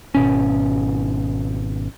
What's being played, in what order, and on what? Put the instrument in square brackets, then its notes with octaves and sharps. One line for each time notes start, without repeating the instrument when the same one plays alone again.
[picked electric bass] G#1 B2 C#4